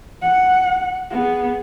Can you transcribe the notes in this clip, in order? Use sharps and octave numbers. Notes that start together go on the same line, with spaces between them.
F#5
B3 G#4